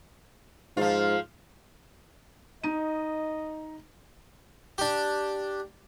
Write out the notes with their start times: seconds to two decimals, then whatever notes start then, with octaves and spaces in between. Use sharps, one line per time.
0.77 G#2 F3 F4
2.64 D#4 D#5 D#7
4.78 D4 G4